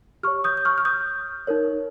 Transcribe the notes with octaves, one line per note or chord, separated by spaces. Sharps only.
G4 C#5 C#6 F6
D#6 G6
G6
C#6 F6
F6
D#6 G6
D#4 A#4 C#5